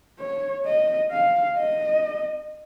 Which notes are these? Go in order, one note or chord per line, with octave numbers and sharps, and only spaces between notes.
C#5
D#5
F5
D#5